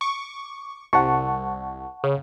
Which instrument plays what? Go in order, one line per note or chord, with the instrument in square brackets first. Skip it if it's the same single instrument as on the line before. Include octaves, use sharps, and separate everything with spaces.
[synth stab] C#6 D6
[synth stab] C2 [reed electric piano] F#5 A5 C#6
[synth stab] C#3